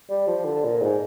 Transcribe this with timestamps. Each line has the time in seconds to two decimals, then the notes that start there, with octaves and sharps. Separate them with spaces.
0.10 G3
0.28 F3
0.45 D3
0.64 A#2
0.81 G#2